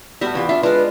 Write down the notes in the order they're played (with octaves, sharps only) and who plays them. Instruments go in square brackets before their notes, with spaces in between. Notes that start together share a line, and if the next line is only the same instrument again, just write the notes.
[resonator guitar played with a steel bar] A2 G3 [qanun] B3 F#4 E5
[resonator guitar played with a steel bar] E3 F4 G4
[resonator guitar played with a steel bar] D4 E5 [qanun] F4
[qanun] G#3 F4 [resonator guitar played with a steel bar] D4 [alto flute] B4